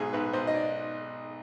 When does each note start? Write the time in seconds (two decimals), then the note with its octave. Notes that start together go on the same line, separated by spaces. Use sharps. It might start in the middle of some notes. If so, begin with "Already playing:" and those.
Already playing: B1 G#2 G#4
0.13 B1 B4
0.33 B1 C5
0.47 D#5
0.54 D5